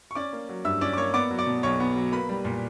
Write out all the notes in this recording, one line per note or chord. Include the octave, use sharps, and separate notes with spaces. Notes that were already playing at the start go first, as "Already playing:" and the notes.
C#6
C#4 D5 D6
A#3
F#3
G2 E5 E6
C#4 D5 D6
D6
A#3 C#5 C#6
B3 D5 D6
F#3
D5 D6
B2
B1 C#5 C#6
B3
F#3
A#3 B4 B5
G3
A#2